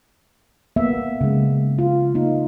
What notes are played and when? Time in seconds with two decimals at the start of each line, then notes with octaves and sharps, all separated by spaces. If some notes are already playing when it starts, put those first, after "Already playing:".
0.76 A#3 B3 E5
1.21 C#3 G#3
1.79 F4
2.15 A#3 D#4